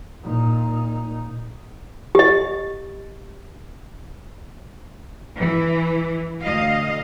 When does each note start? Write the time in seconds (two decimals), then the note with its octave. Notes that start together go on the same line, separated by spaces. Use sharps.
0.23 A#2 D#4
2.15 G4 D#5
5.38 E3
6.42 D2 D#5 F5